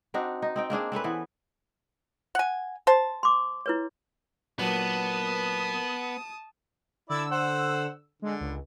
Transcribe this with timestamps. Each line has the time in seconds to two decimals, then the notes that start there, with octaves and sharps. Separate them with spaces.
0.14 C4 D4 D#4 F#4
0.42 D#4
0.56 C4 D#4 G5
0.70 A#3 C4 D4 G#4
0.92 C4 C#4 A4 B4
1.04 E3 B3
2.35 F#5 G#5
2.87 C5 A5
3.23 C6 D6
3.66 E4 B4 C#5
4.59 A#2 F#3 B3 D4 A#4 B4 A5 D#6
7.10 D3 E4 D5 E6
7.31 C5 F#5
8.22 D3 G#3
8.40 C#2